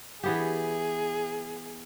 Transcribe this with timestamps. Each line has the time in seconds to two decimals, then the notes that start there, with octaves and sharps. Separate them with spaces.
0.23 E3 B3 G4 G#4